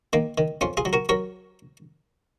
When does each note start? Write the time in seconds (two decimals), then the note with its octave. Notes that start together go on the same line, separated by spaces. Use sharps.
0.13 D#3 A#3
0.38 D#3
0.61 F2 C#4 F4
0.77 F4 G#4
0.85 F#3
0.93 F#4 A#4
1.09 F#3 A#4 C#5